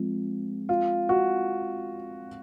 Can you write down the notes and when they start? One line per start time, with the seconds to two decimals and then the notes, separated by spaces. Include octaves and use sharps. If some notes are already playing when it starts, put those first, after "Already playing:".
Already playing: F3 G#3 C4
0.69 F4
1.09 F#4